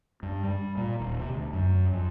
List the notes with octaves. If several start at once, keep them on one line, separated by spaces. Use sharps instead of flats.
G2
G3
A#2
D#1
C3
D2
F#2
F2